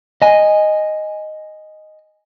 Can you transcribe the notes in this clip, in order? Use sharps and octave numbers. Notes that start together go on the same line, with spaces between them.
D#5 G#5